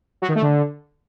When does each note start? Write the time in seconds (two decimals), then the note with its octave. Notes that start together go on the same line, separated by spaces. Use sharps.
0.22 F#3
0.29 D#3
0.35 A3
0.42 D3